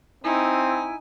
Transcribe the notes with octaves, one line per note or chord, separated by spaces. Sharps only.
C4 D#4 E4 G#5